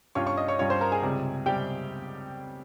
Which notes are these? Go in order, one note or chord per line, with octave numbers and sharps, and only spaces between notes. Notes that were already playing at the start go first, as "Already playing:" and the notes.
G2 G3 C#4 F4 C#5 C#6
C#5 C#6
D#5 D#6
C#5 C#6
G2 G3 C#4 F4 C#5 C#6
C5 C6
A#4 A#5
G#4 G#5
C#2 C3 G3 C4
C3 G3 C4 G4 G5